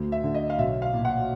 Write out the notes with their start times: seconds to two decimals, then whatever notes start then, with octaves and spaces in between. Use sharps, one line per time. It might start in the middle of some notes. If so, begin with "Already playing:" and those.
Already playing: D2 D3
0.12 E5
0.23 D3
0.34 D#5
0.50 F5
0.58 B1 E5
0.82 F5
0.93 A#2
1.05 F#5